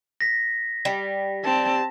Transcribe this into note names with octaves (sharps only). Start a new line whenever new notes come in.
A#6 B6
G3
C4 A5